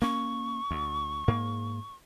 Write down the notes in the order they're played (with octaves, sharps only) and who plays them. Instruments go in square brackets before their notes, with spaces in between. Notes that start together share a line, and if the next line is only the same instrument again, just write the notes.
[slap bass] A#3 C#4 [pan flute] C#6
[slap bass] D2
G#2 A#3